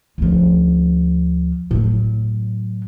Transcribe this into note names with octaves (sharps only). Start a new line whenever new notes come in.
D2 F3
A2 F#3